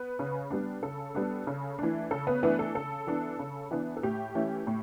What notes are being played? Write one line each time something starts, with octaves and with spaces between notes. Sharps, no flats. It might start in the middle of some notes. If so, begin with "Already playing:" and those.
Already playing: B3 B4
C#3
G3 B3 D4
C#3 A4
G3 B3 D4
C#3
E3 A3 D4
C#3 A4
B3 B4
E3 A3 B3 D4 B4
A4
C#3 A4
E3 B3 D4
C#3
E3 B3 D4
A4
A2 G4
E3 A3 C#4
A2